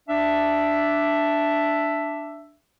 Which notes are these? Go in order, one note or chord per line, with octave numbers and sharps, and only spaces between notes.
D4 E5